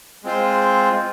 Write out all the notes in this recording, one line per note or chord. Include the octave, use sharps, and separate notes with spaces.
G#3 C4 F4 C5